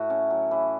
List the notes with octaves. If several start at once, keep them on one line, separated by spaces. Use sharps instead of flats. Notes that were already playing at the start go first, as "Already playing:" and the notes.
Already playing: A2 F#4
C#4
F#3
E3